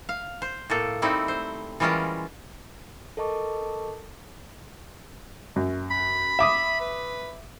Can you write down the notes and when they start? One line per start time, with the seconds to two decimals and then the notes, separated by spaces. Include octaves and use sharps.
0.09 F5
0.42 C5
0.70 A2 A#3 A4
1.02 G3 A3 C4 D#4 E4
1.28 C5
1.80 E3 G3 G#3 C#4 F4 A#4
3.17 A4 A#4 D#5 A5 C#6 D6
5.56 F#2
5.90 B5
6.39 E5 D6 D#6
6.80 B4